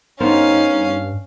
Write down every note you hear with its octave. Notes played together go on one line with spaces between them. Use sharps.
G2 B3 C#4 D#4 A#4 C5 F5